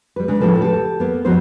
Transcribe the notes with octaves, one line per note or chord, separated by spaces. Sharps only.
G3 B4
C#3 G#3 D4
A2 C#3 F3 A4 B4
G4 A4
A#3 B3
F2 B3 F#4 G4 C5